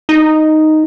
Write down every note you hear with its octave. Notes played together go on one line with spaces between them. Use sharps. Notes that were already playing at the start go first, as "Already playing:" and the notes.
D#4